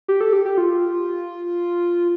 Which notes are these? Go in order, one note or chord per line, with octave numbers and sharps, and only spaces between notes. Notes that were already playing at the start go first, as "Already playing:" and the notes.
G4
A4
G4
G4
F4